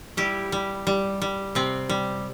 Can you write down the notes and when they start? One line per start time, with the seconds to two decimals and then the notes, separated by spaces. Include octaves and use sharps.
0.17 G3 E4 G4
0.52 G3
0.87 G3
1.22 G3
1.55 C3 C4
1.89 G3